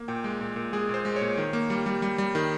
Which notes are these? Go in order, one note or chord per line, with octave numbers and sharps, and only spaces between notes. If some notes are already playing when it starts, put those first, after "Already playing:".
Already playing: A#3
A#2 G5
G#3
A#2
A#2
G#3 G#4
A#2
C5
G#3
C#5
A#2
D#3
A#3
G3
G3
G3
G3
D#3